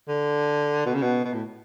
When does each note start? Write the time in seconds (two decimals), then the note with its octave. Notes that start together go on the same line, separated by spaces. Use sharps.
0.08 D3
0.86 B2
0.94 C#3
1.02 B2
1.25 B2
1.33 A2